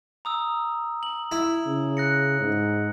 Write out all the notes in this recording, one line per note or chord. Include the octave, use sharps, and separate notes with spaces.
A#5 D#6 E6
F#7
E4
C#3
F#6 A#6 C#7
G#2